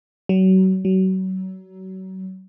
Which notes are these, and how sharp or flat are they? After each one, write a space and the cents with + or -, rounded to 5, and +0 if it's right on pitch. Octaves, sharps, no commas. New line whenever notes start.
F#3 +30
F#3 +30